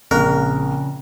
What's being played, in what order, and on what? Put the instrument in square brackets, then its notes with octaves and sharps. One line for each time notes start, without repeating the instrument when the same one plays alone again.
[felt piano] A#1 [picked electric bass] C#3 [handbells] C4 F#6 [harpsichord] A#4